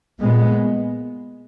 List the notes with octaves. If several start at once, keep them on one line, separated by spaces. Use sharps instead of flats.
A#2 G#3 B3